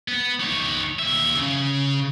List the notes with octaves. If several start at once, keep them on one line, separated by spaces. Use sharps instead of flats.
B3
D#4 C#5
D#2 E5
C#3